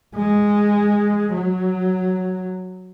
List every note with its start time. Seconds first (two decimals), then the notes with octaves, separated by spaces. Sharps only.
0.16 G#3
1.33 F#3